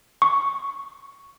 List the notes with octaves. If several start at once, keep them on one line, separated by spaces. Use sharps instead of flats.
C#6